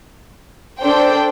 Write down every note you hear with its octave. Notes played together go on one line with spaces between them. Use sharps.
D4 A4 C5 G5